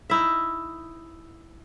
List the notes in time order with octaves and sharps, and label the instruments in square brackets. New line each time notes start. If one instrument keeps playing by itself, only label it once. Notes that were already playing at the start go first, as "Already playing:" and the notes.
[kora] D#4 E4 E5